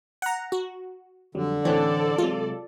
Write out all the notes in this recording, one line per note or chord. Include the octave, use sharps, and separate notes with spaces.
F#5 A#5
F#4
F2 D3 F#3 G3
A2 E3 C4 C#4 A4 D5
C3 F#3 G#3 F4